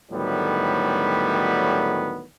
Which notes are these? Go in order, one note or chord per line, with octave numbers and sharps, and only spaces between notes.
D2 A2 D#3 F#3 G3 B3